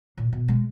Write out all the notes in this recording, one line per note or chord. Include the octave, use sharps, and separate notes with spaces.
A#2
B2
G#3